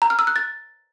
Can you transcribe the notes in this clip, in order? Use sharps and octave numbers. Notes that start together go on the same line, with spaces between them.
A#5
F6
E6
F#6
A6